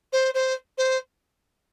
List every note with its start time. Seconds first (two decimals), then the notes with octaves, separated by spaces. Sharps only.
0.12 C5
0.34 C5
0.77 C5